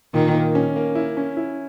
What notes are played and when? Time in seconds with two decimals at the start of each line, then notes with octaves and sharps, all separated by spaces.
0.14 A#2 D#3
0.34 A#3
0.55 C#4
0.76 A#3
0.95 E4
1.17 C#4
1.37 E4